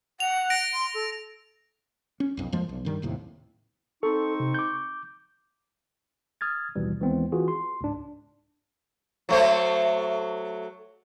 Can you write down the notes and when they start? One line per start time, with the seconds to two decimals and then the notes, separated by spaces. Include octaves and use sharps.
0.20 F#5 F7
0.50 A#6 D7
0.74 C6
0.94 A4
2.20 C#4
2.37 B1 F2
2.52 F2 F3 G#3 A#3
2.69 B1
2.85 G2 D#3 G3
3.02 F#1 D#2 A2 C3
4.03 C4 D#4 A4 C#6
4.40 C3
4.54 D6 G6
6.41 D#6 F6 G#6 A6
6.76 A1 D#2 B2 E3 G3
7.00 D#2 E3 G#3 B3 C4
7.32 E3 F4 F#4 G#4
7.48 C6
7.81 C#2 G#2 D4
9.29 F#3 A3 C5